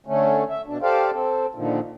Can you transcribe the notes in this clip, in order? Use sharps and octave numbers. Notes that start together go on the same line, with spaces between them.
D3 A3 C#4
E5
B2 D4
G4 A4 C5 D5 F5
C4 A4
A#2 D3 D#3 F3